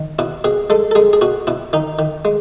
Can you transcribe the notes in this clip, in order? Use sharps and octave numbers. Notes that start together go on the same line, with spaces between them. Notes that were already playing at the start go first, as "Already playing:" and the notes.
Already playing: D#3
B2 E4
B2 G#4
G#3 A4
A4
G#3 G#4
G#4
B2 F#4
B2 E4
D#3 D#4
D#3
G#3